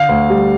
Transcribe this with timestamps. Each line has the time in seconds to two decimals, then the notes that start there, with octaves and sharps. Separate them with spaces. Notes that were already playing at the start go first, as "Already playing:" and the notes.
Already playing: D3 F5
0.09 D2
0.30 G3